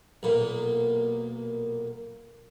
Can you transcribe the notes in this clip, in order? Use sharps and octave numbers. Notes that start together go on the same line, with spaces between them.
B1 A#2